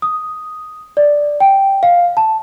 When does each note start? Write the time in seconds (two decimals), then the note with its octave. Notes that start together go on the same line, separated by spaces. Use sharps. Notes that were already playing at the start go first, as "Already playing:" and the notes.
0.02 D#6
0.97 D5
1.40 G5
1.83 F5
2.17 A5